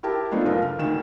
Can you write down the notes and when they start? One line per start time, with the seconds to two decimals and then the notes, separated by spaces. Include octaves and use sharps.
0.03 E4 G4 A#4 A5
0.31 F3 A3 B3 D4 D#4 F4
0.45 F#1 F4 A#4
0.62 F6
0.79 D2 D#3 E7